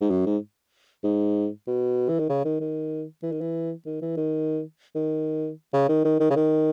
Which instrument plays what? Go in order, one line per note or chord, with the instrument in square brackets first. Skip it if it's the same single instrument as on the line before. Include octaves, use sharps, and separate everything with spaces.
[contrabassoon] G#2
F#2
G#2
G#2
B2
E3
D#3
C#3
D#3
D#3
E3
D#3
E3
D#3
E3
D#3
D#3
C#3
D#3
D#3
D#3
C#3
D#3